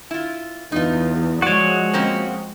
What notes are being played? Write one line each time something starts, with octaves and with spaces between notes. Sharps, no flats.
E4 F4
E2 D#4 F4
F3 F#3 G#3 F#4 C#5 D5
A#3 C4 C#4